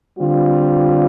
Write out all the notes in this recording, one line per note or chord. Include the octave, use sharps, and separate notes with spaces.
D3 G3 C4 F4